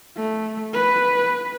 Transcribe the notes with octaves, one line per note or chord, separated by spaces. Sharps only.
A3
B4